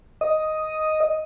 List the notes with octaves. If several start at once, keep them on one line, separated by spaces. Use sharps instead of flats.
D#5